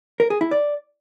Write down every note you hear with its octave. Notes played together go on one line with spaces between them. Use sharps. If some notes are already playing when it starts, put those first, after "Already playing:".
A#4
G#4
E4
D5